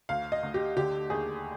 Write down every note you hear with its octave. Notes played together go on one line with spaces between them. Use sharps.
D2 F5
D#5
D2
G4
D3 G4
D#2 G#4